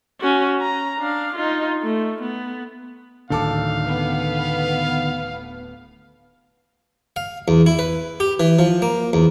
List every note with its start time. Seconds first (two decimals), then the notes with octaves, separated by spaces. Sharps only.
0.21 C#4 F#4
0.61 A#5
1.00 D4 F5
1.36 D#4 F4
1.83 A3
2.22 B3
3.30 D1 D3 D#3 A4 F5 D6
3.86 B3
7.16 F5
7.48 E2
7.66 E4
7.79 B4
8.20 G4
8.40 E3
8.59 F3
8.82 A#3
9.13 E2